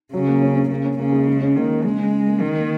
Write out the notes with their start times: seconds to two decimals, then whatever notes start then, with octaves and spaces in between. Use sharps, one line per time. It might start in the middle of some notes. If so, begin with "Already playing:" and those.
0.13 C#3 F#3
0.27 A#3
0.42 C#4
0.56 C#4
0.70 C#3 A#3
0.85 C#4
0.99 C#3 A#3
1.13 G#3
1.27 G#3
1.41 C#4
1.56 D#3 A#3
1.84 C#3 G#3
1.98 C#3
2.12 C#3
2.27 A#3
2.41 D#3 A#3
2.56 A#3